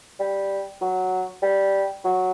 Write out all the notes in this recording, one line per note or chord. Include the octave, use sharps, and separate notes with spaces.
G3
F#3
G3
F#3